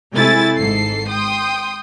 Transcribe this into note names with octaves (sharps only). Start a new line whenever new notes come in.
C3 G#3 A3 E4 G#5 A6
G#1 G#2 A4 C7
G5 C6 D#6